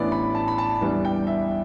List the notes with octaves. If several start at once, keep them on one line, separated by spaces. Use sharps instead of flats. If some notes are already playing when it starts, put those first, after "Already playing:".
Already playing: A1 A2 E3 B3 D4 D5
B5
A5
B5
A5
E2 E3 G3 B3 D4
G5
E5